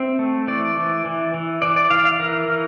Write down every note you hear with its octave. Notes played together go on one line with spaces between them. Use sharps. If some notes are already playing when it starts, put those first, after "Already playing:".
Already playing: C4 E5
A3
E3 D5
E3
E3
E3
E3 D5
D5
E3 F5
F5
E3 A#4
E3